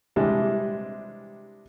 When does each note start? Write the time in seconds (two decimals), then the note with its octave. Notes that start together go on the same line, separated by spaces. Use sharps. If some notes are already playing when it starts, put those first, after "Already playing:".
0.16 C3 E3 G3 G#3 D4 G4